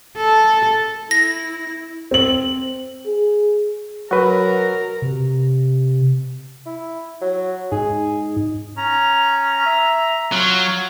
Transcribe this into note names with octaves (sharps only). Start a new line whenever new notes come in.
A4
E4 A#6
C4 F#7
G#4
F#3 F#4 A#4 B4
C3
E4
F#3
G#2 D#4 G#4
C#4 A#5
E5
F#3 F4